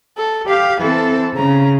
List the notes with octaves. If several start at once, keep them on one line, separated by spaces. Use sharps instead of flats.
A4
G4 F5
E3 C4 A4
C#3 A#5